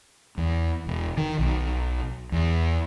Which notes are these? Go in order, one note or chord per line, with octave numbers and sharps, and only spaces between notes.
E2
E1
D#3
B1
E2